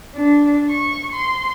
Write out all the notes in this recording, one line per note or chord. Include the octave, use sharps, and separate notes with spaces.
D4
C#6
C6